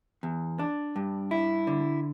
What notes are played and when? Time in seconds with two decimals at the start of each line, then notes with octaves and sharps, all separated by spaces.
0.23 E2
0.59 D4
0.96 G2
1.31 E4
1.67 D3